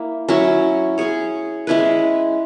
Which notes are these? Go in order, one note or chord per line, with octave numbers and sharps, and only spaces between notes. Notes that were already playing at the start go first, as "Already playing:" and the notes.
Already playing: A#3 E4
F#3 C#4 E4
C#4 G#4 C#5
G#3 C#4 E4 B4